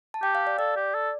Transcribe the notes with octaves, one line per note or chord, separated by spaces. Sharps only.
A5
G4 G5
F5
D5
A4 D5
G4
A4